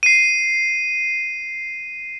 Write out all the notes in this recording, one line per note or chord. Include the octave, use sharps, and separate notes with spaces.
C7 D#7